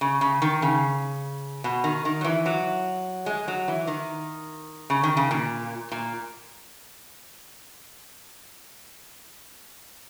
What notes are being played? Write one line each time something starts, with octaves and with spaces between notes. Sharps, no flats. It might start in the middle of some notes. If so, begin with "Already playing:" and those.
C#3
C#3
D#3
C#3
B2
D#3
D#3
F#3
E3
F#3
G#3
F#3
E3
D#3
C#3
D#3
C#3
A#2
A#2